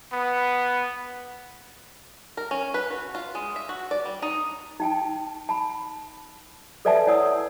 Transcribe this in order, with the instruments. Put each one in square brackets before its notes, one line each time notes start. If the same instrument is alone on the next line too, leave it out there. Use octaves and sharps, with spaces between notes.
[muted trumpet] B3
[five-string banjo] A#4
C#4
B4
F#4
F4
G#3
E5
F#4
D5
G3
D#4
[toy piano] D#4 G5 A5
A5 B5
A4 B4 D5 E5 G#5 A5
E4 C#5 D5 F#5 D#6 E6